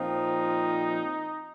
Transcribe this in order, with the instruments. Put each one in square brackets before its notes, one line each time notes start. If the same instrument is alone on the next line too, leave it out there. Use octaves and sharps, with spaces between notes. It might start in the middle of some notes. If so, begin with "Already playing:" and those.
Already playing: [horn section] A#2 F3 C4 D#4